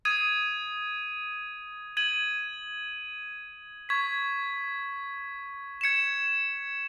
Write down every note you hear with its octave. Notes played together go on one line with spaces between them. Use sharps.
D#6 G#6 D#7
G#6 D#7 F#7
C#6 G#6 B6
G#6 C#7 E7